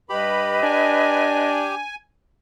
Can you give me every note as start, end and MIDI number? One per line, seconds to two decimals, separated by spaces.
0.10 0.60 43
0.10 1.75 67
0.10 1.50 71
0.10 1.50 75
0.10 0.60 83
0.63 1.82 62
0.63 1.95 80